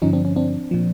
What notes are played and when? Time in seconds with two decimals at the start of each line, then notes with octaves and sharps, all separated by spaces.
0.02 G2 D3 F3 C#4 D#4
0.13 C4 D4
0.25 C#4
0.36 C4 D4
0.71 A#2 F3